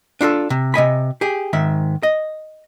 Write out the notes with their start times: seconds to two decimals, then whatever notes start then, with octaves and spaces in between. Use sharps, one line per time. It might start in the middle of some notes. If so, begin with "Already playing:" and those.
0.21 D4 F4 G4 A4
0.50 C3
0.74 C3 D#5 G#5 B5
1.21 G4 G#4
1.53 G#2 D#3 E5
2.03 D#5